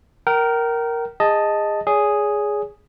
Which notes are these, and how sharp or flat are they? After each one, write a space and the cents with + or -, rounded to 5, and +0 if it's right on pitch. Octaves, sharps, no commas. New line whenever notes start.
A#4 +0 G5 -35
G#4 -25 D#5 +0 A5 +0
G#4 +0 C#5 +45